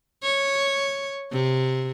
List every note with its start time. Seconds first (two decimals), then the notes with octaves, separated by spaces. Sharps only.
0.23 C#5
1.32 C3